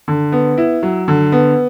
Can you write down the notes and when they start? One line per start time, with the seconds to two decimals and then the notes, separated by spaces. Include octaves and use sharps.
0.08 D3
0.32 B3
0.58 E4
0.83 F#3
1.08 D3
1.32 B3